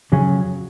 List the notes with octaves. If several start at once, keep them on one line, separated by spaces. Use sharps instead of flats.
F2 C#3 F#3 C#4 G#4